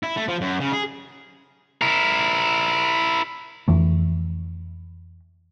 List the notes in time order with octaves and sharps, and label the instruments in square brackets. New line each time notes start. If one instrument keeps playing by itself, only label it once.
[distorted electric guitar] E4
A3
F3
F#2
C#3
G#4
E4 A#4
[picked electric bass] F2 E3 A3